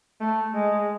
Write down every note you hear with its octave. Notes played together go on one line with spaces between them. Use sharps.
A3
G#3